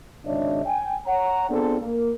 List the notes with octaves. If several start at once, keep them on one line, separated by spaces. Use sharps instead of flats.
G#1 C#2 D4 C#5 D#5 E5
G5 G#5
C#5 F#5 A#5
B3 C4 D4 F4 G#4 A4
A#3 A#4